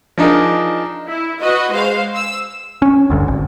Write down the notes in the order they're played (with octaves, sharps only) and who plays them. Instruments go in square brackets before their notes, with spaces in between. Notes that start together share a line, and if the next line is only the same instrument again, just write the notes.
[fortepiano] F3 D4 D#4 G#4 A#4
[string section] E4
F#4 B4 D#5
G#3 C5 F5
E6
[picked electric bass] C#4
G#1 D2 G2
G#1